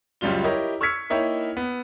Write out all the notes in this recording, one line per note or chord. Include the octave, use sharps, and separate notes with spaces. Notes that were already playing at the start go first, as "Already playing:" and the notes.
C#2 F#2 G3 C#4 F4 G7
E4 G4 A#4 C#5 D#5
C#6 E6 F6 G#6 B6 C#7
A#3 D#4 E4 C#5 E5 G5
B3